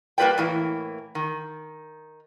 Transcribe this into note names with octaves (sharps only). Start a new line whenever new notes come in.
G3 A#3 F#4 B4 D5 G5
A2 E3 A#3
D#3